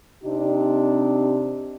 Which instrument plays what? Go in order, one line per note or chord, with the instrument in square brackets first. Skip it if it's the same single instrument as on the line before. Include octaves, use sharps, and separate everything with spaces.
[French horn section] C3 C4 D4 D#4 G4